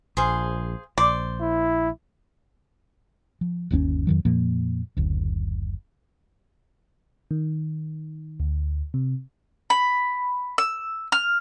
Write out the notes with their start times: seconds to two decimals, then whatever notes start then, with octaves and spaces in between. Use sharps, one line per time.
0.17 A#1 G#4 C5 F5
0.98 A#1 C5 D5
1.41 E4
3.41 F3
3.71 G1 D#2 C4 C#4
4.07 F2 D#3 F#3
4.25 F2 A#2 F3 A#3
4.97 F#1 D2
7.31 D#3
8.40 D2
8.94 C3
9.70 B5
10.58 E6
11.12 F6